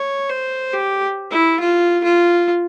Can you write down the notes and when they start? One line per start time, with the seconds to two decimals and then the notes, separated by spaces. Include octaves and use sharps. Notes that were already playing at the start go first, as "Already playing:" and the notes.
Already playing: C#5
0.29 C5
0.73 G4
1.31 E4
1.60 F4
2.04 F4